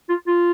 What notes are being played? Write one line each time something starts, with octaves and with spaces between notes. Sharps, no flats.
F4
F4